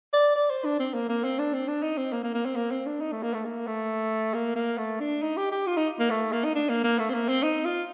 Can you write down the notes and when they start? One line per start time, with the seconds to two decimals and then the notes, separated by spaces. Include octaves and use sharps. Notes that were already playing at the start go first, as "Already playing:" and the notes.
0.13 D5
0.36 D5
0.50 C5
0.65 D4
0.80 C4
0.94 A#3
1.09 A#3
1.24 C4
1.39 D4
1.53 C4
1.68 D4
1.83 D#4
1.98 C4
2.13 A#3
2.23 A#3
2.34 A#3
2.45 C4
2.56 A#3
2.71 C4
2.86 D4
3.01 D#4
3.12 A3
3.23 A#3
3.34 A3
3.45 A#3
3.67 A3
4.34 A#3
4.55 A#3
4.78 A3
5.00 D4
5.22 D#4
5.37 G4
5.52 G4
5.67 F4
5.77 D#4
6.00 A#3
6.10 A3
6.32 A#3
6.45 D#4
6.55 D4
6.69 A#3
6.84 A#3
6.99 A3
7.10 C4
7.14 A#3
7.28 C4
7.43 D#4
7.65 F4